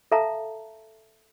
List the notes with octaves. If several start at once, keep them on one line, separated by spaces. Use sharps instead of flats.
A4 E5 F5 A5 A#5